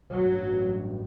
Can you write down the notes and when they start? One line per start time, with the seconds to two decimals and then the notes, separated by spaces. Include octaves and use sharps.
0.12 A1 G2 F#3